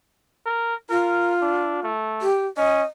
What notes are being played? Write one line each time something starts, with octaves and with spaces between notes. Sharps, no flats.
A#4
F4 A#4
D4
A3
G4
C#4 D#5